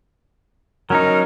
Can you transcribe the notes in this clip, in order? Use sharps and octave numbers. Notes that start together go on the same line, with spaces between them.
F#3 C#4 D#4 A#4